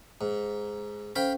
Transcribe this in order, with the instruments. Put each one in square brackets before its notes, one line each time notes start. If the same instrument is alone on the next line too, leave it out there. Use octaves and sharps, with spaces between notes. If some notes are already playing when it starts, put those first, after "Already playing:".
[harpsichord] G#2
[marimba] C#4 A4 C5 [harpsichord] F5 G5 B5